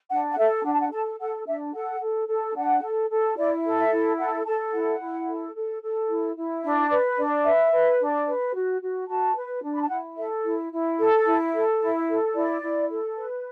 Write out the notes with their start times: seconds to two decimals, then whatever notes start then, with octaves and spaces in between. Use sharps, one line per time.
0.10 D4 F#5
0.31 F#5
0.38 A4 E5
0.65 D4 F#5
0.73 A5
0.80 F#5
0.92 A4 A5
1.19 A4 F#5
1.47 D4 E5
1.74 A4 F#5
2.01 A4
2.29 A4
2.56 D4 F#5
2.82 A4
3.11 A4
3.37 E4 D5
3.64 A4
3.78 E5
3.92 E4
4.19 A4 F#5
4.46 A4 A5
4.73 E4 F#5
5.00 E4
5.27 A4
5.55 A4
5.82 A4
6.09 E4
6.37 E4
6.63 D4 E5
6.91 B4 D5
7.18 D4 D5
7.45 B4 E5
7.72 B4
8.00 D4
8.26 B4
8.54 F#4
8.81 F#4
9.08 F#4 A5
9.36 B4
9.63 D4
9.75 B5
9.82 A5
9.90 E4 F#5
10.17 A4 E5
10.44 E4
10.72 E4
10.99 A4
11.26 E4
11.53 A4
11.81 E4
12.07 A4
12.35 E4 D5
12.62 E4
12.89 A4
13.17 B4